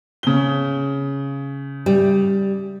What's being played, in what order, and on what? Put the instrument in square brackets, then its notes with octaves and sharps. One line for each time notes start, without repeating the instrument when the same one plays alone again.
[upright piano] C#3 G7
[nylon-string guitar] G3